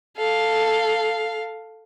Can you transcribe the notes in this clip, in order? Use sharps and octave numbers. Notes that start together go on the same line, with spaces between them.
A4 F5